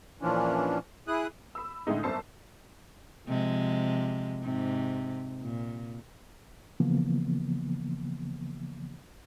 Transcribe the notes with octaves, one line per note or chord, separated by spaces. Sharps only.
A#2 E3 F3 C#4 D4
E4 G#4 D#6 F#6
B5 E6
A2 D3 G#3 D#4
G1 F#2 C5 A5 E6 C7
C3 F3 G#3
G#2 C3
A#2
C#3 E3 F3 A#3 B3